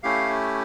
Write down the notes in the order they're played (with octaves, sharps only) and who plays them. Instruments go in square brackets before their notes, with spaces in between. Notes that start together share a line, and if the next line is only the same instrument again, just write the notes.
[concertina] A3 C#4 E4 G4 F5